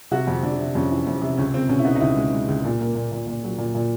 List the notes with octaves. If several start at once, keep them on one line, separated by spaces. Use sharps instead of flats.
C3 F#4
F2
F2 D4
C3
F2 C#4
E3
F2
C3
C#2 C#4
C#2 C4
B2 C#4
E4
B3 D#4
D#4
C#2 E4
G#3
G#3
C#2
A#2
A#3
A#2
A#2
A#2
F#3
A#2
A#2